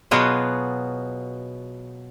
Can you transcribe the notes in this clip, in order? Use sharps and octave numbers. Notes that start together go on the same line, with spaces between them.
B2 F#3 B3 F4 G#4